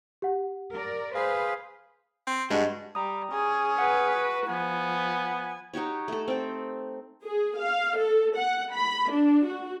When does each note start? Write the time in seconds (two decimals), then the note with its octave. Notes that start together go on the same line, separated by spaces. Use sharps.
0.22 G4 F#5
0.72 A#4 D5
1.15 G#4 B4 C5 F5
2.27 C4
2.51 G2 G#3 F#4
2.95 G3 A#5 D#6
3.31 C#4 G#4
3.78 B4 F#5
4.14 F#4
4.48 F3 B3 G#5
5.73 D#4 F#4 G4 C#5
6.08 A3 A4
6.28 C4 G5
7.23 G#4
7.60 F5
7.98 A4
8.36 F#5
8.74 B5
9.11 D4
9.45 F#4